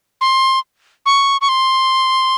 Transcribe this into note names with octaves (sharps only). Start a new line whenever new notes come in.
C6
C#6
C#6
C6